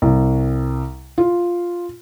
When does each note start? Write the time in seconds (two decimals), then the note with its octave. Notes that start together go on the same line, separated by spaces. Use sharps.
0.02 C2
1.18 F4